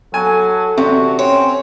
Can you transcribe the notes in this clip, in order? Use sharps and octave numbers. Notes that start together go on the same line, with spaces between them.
F#3 A4 G#5
E2 C3 F#4
C4 C#4 C#5